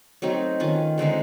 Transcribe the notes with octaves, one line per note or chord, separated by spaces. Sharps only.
F#3 A3 C4 D#4
D#3 C#4 F4 B4
D3 G#3 C4 D#4